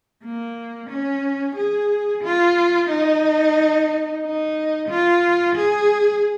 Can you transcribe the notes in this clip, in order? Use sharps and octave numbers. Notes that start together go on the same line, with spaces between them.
A#3
C#4
G#4
F4
D#4
D#4
F4
G#4